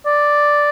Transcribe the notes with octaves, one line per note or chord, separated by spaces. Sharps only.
D5